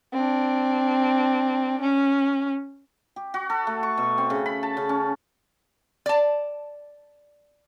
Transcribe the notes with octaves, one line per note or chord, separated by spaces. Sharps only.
C4 D4
C#4
G4
F#4
A4
A3
C#6
B2
C4
C#3
B5
A5
C#3
C#4
D5 A5